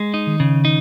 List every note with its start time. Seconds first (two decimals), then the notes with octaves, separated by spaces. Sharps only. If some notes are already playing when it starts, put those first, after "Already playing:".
Already playing: G#3
0.14 D#4
0.27 D#3
0.40 C#3
0.65 D#4